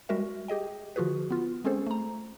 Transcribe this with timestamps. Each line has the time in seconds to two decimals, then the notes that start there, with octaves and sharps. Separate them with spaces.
0.09 G3 G#3 F#4 A#4 E5
0.48 G4 G#4 D#5 G5
0.96 D3 F3 F4 F#4 G#4 B4
1.30 B3 F4
1.64 G#3 C4 C#4 G#4 A4 C5
1.87 A3 A#5